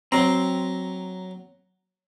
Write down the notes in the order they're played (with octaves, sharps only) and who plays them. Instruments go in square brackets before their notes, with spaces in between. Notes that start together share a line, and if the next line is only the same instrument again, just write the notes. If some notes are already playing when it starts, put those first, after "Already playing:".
[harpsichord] F#3 A#5 [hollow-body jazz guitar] C4